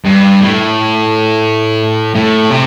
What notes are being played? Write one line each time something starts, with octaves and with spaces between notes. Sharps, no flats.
G2
A2
A2
C3